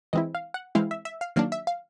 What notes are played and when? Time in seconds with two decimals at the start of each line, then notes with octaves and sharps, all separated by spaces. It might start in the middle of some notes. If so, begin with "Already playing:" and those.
0.13 E3 G#3 C4 E4 D#5
0.35 F5
0.54 F#5
0.75 E3 G#3 C4 E4 F5
0.91 E5
1.05 E5
1.21 F5
1.36 D#3 F#3 A#3 D4 F5
1.52 E5
1.67 F5